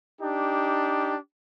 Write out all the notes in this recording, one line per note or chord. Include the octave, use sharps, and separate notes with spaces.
D4 D#4 G4